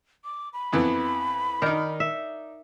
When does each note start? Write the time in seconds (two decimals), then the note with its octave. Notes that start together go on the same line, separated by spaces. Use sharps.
0.24 D6
0.53 B5
0.72 F2 E3 B3
1.62 D#3 D4 D#4 A#4
2.00 E5